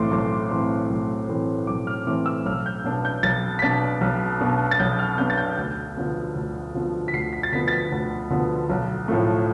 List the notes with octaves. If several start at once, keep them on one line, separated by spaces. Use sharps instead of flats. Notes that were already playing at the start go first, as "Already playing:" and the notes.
Already playing: B1 A2 E3 A3 C4 C6 D6
B1 D6
A2 E3 A3 C4
B1
A2 E3 A3 C4
B1 D6
F6
A2 E3 A3 C4 D6
E6
B1 F6
G6
B2 B3 D4
G6
B1 A6
B6
B2 B3 D4 A6
B1
B2 B3 D4
A6
B1 G6
F6
B2 B3 D4 G6
A6
G6
D2 G6
D3 F3 B3
D2
D3 F3 B3
B6
D2 C7
B6
A6
D3 F3 B3 B6
A6
B6
D2
D3 F3 B3
B1
A2 F3 A3